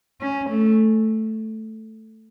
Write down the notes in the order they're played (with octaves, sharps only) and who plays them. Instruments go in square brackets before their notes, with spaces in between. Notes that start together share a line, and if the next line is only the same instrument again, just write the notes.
[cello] C#4
A3